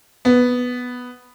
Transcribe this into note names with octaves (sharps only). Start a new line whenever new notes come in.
B3